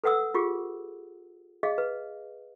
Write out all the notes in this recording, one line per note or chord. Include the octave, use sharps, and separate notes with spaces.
A4 B4 F#5 D#6 E6
F4 G4 G#4
G#4 D#5 F5
B4